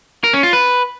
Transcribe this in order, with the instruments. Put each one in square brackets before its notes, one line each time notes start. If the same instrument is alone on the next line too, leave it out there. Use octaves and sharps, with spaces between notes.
[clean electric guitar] A#4
C#4
F4
B4